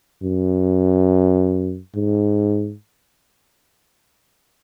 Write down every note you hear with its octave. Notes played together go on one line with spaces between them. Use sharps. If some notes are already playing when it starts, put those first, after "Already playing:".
F#2
G#2